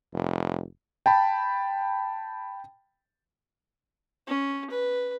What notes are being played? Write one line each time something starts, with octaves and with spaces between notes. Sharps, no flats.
F1
G5 A5 B5
C#4
B4